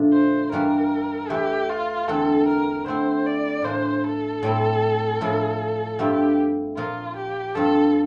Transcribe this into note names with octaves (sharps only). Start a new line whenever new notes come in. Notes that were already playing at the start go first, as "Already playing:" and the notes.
Already playing: A#2 D3 F3 A3 D4
C5
G2 E3 G3 A#3 A#4
E2 E3 A3 E4 G4
F4
E2 D3 A3 C4 A4
A#4
D3 A3 C4 E4 C5
D5
A2 E3 A#3 D4 C5
A4
A2 G3 C4 E4
A2 F3 A#3 E4
G2 F3 A3 C4 E4 G4
A#2 F3 A#3 F4
G4
G2 F3 C4 A4